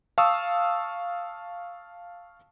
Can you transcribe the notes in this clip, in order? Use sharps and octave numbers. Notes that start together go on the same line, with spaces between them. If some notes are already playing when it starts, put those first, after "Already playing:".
F5 A5 C#6 D#6 E6